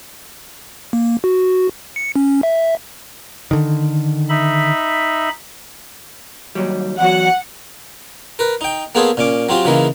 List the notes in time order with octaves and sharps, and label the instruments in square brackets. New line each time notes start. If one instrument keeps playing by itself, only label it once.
[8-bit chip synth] A#3
F#4
C#7
C#4
E5
[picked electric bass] D3 D#3
[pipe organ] D#4 E5 B5
[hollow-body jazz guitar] D#2 F#3 G3
[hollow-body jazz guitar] E2 F#3 F#4 [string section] F#5
[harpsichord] A#4 B4
D#4 G5
A#3 B3 G#4 A4 C5 C#5
A#2 C#4 D6
F#3 C4 F4 G4
C#3 E3 G#3 A#3 D#4 E4